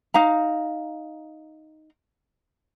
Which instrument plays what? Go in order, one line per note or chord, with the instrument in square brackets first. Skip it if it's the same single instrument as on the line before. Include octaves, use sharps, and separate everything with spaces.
[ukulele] D#4 F5 A#5